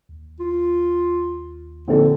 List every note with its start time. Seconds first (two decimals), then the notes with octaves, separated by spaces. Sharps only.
0.09 D#2
0.40 F4
1.88 A#1 D3 C4 A4